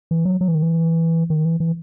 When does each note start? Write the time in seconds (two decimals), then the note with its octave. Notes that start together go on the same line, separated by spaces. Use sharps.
0.11 E3
0.25 F#3
0.41 F#3
0.48 E3
0.55 D#3
0.62 E3
1.30 D#3
1.45 E3
1.60 E3